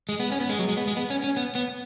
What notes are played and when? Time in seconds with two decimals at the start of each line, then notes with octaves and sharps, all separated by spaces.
0.09 G#3
0.20 B3
0.32 C#4
0.40 B3
0.49 G#3
0.59 F#3
0.68 G#3
0.77 B3
0.87 G#3
0.97 B3
1.10 C#4
1.24 C#4
1.37 B3
1.55 B3